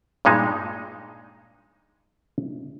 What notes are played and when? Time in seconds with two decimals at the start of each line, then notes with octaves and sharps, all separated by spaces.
0.25 G2 A#2 G#3 D#4